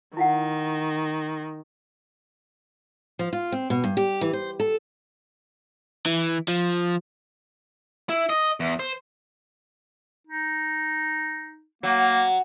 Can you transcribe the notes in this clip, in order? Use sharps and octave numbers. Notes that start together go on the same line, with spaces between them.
D#3 E4 F5 F#5
F3
F4
C4
B2
G2
G4
E3
C5
A4
E3
F3
E4
D#5
E2
C5
D#4
F#3 A#3